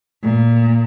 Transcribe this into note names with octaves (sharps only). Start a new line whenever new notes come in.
A#2